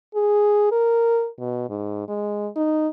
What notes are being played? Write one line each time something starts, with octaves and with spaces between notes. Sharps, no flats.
G#4
A#4
B2
G#2
G#3
D#4